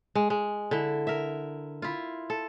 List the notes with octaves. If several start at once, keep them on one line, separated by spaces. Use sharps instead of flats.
G#3
G#3
D3 E4
A#4 E5
E4 F4
A4